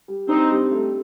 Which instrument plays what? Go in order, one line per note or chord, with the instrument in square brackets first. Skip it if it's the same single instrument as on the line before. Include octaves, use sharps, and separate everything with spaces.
[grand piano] G3
[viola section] C4 D#4 [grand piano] D4
[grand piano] G3
A3